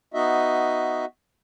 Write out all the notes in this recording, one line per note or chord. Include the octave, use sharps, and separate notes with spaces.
B3 D#4 F#4 D#5 E5